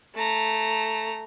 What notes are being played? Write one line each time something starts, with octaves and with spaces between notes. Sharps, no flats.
A3 A#5